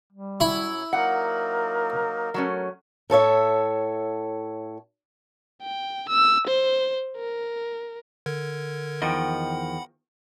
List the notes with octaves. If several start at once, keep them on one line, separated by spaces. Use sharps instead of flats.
G3
F#2 F#3 E4 C#5 B5
F#3 A#3 D#4 A#4 F#5
F#3 A3 C#4
A2 A4 C#5 E5
G5
E6
C5
A#4
D3 A#4 G#6
E2 D#3 F3 D#5 F#5 G5 B5